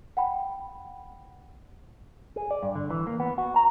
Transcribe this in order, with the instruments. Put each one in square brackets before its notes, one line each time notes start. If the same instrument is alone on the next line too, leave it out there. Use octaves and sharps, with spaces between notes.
[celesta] F#5 G5 B5
[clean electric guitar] G#4
D5
G2
D3
E3
A#3
B3
F#4
A#5